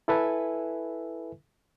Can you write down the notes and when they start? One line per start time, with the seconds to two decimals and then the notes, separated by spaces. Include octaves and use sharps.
0.08 E4 A4 B4 E5 G#5